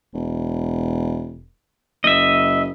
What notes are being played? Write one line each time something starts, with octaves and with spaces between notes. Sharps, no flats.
E1
F#1 D#5 E5